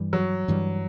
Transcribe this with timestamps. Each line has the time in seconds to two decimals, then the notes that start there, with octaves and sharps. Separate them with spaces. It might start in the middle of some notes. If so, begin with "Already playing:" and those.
Already playing: G2 E3 G3
0.13 F#3
0.48 G2 E3 G3